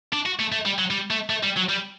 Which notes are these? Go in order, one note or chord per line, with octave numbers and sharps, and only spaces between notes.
D4
F#4
A3
A3
G3
F#3
G3
A3
A3
G3
F#3
G3